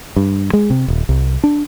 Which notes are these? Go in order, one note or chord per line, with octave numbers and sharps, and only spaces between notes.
G2
G#3
C3
D#1
C2
D4